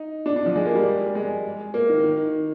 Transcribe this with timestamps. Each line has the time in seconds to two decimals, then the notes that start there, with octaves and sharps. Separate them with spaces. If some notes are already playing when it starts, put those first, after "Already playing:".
Already playing: D#4
0.26 D4
0.36 D4
0.46 F3
0.56 G#3
0.66 A#3
0.75 G3
1.15 G#3
1.74 A#3
1.89 D#3
2.04 D#3